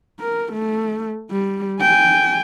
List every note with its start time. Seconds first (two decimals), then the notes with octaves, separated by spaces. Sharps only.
0.20 A#4
0.52 A3
1.31 G3
1.81 G5 G#5